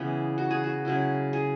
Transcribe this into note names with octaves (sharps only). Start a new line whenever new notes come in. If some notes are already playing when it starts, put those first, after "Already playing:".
Already playing: C#3 E3 B3
F#4
G#4
F#4
C#3 F#3 C#4 E4
G#4